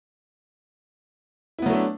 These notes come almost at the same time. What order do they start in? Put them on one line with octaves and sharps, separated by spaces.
E4 B3 F#3 A3 D4